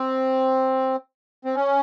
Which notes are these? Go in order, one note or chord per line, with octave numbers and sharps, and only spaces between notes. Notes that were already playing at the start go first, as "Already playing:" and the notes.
Already playing: C4
C4
C#4